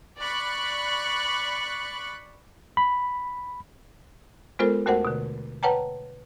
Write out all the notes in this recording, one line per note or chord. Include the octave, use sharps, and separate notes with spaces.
D5 B5 C#6 F#6
B5
G#3 B3 F4 A4 A#4 C5
D#2 A3 F#4 A#4 C5 F#5
B2 D3
B4 C#5 F#5 G5 A5 A#5